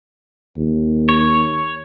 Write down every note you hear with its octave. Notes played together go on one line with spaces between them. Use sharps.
D#2
C#5